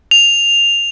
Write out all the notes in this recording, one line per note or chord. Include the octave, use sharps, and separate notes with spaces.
F7